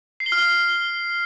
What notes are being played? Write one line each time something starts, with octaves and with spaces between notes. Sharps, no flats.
C7
G7
F6